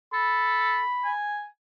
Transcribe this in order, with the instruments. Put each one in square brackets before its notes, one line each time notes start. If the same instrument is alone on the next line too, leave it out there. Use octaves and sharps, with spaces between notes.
[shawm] A4 [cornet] B5
[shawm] G#5